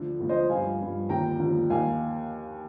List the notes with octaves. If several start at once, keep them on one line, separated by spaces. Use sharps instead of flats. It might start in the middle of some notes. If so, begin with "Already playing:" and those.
Already playing: D2 D3 F3
D2 D3 F3
C5 D#5
G2 F3 F5 G#5
G2 F3
D#2 D3 F3 G5 A#5
D#2 D3 F3
D#2 D#3 F5 G#5